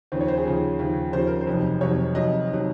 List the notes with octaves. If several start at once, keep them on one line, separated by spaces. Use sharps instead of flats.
D#2 C#3 F3 C5
C#5
C5
G#4
D#2 C#3 F3
D#2 C#3 F3
D#2 C#3 F3 C5
A#4
C5
F1 F2 D#3 F#3
F1 F2 D#3 F#3 C#5
F1 F2 D#3 F#3 D#5
D#3 F#3